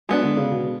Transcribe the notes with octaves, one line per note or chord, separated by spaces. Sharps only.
F#3 G#3 B3 D4
D3
C#3
B2